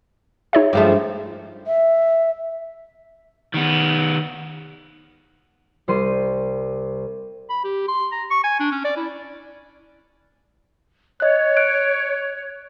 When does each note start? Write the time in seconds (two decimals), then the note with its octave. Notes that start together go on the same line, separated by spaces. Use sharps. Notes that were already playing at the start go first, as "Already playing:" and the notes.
0.53 D#4 G#4 C#5 E5
0.73 G2 F3 G#3 A3
1.67 E5
3.54 D#3 B3
5.88 C2 G3 C5 C6 C7 D#7
7.49 B5
7.64 G4
7.88 C6
8.12 A#5
8.31 C#6
8.44 G#5
8.60 D4
8.72 C#4
8.84 D5
8.97 E4
11.20 C#5 D#5 F#6
11.57 F#6 D7